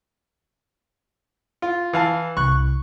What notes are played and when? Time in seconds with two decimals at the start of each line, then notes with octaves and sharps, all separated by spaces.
1.62 F4
1.93 E3 F5 A5
2.37 C2 C#6 F#6